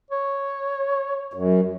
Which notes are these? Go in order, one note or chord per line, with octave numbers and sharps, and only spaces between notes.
C#5
F#2